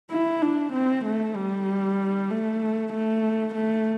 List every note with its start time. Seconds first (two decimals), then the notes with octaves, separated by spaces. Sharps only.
0.10 E4
0.42 D4
0.73 C4
1.05 A3
1.35 G3
2.30 A3
2.93 A3
3.55 A3